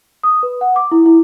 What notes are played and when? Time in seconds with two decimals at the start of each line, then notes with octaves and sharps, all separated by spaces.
0.23 D#6
0.43 B4
0.61 F#5
0.76 D6
0.91 E4
1.06 E4